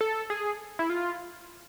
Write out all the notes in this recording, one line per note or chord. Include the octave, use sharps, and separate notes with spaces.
A4
G#4
E4
F4